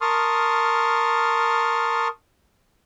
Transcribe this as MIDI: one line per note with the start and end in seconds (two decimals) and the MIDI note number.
0.01 2.08 70
0.01 2.08 81
0.01 2.08 84
0.01 2.08 85
0.01 2.08 87
0.01 2.08 89